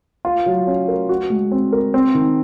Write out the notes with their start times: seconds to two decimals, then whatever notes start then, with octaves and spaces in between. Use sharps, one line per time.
0.25 F4
0.46 F#3
0.67 C#4
0.88 A#4
1.09 F#4
1.30 G#3
1.52 C4
1.73 A#4
1.94 C4
2.14 D#3